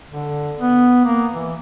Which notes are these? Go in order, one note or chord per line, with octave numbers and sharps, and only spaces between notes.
D3
B3
A#3
E3